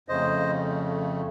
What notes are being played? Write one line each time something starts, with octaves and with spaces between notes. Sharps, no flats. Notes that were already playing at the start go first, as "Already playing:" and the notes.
F2 C#3 A3 C5 D#5